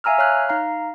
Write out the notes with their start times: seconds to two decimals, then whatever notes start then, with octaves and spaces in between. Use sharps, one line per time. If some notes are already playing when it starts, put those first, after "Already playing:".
0.04 E5 F5 G#5 A#5 E6 F6
0.18 C#5 F5 F6 F#6
0.49 D#4 F5 A#5